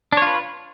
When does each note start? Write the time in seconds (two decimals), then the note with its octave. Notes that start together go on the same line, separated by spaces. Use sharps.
0.12 D4
0.17 C#5
0.22 F4
0.27 B4